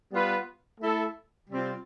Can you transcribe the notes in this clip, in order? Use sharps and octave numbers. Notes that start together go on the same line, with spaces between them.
G3 B3 F4 B4
A3 E4 A4
C3 G3 C4 F4